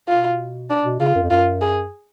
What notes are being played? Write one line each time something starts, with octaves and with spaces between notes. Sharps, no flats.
B2 F4
D4
B2
C#3 F4
F#2
F2
F#2 F4
G#4